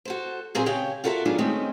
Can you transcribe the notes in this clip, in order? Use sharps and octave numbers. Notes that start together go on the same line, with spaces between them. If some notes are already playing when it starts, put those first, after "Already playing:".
F#4 A4 C5
A#2 F#3 C4 G#4 A#4 G#5
C#3 G4 C#5 G5
F4 F#4 A4 A#4 D#5 E5
D#3 F#3 B3 D4 F4 G#4
D#3 G#3 A3 C4 C#4 D#4